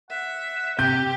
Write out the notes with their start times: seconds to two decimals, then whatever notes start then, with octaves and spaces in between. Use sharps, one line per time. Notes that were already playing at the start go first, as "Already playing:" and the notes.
0.10 E5 F#5
0.79 C3 G4 G6